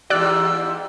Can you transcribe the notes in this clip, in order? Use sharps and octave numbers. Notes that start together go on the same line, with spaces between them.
E2 G#2 G4 D5 E6 F#6